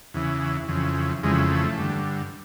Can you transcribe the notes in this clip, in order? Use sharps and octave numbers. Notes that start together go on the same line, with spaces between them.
E2 C#3 E3
F2 C#3 E3
F2 C#3 E3 G#3
A3
G2 D3